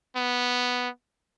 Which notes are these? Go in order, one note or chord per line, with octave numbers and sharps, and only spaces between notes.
B3